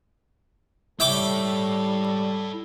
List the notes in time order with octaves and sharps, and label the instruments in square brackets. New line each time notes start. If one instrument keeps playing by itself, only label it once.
[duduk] G3 [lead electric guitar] E4 C#5 [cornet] A4 [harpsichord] E5 G5 D6